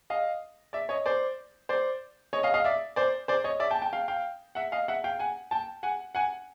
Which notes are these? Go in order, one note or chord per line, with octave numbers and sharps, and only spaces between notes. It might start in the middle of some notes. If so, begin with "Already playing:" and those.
D#5 F5
D5 E5
C#5 D#5
C5 D5
C5 D5
C#5 D#5
D#5 F5
D#5 F5
D5 E5
C5 D5
C5 D5
C#5 D#5
D5 E5
G5 A5
G5 A5
F5 G5
F5 G5
E5 F#5
D#5 F5
E5 F#5
F5 G5
F#5 G#5
G5 A5
F#5 G#5
F#5 G#5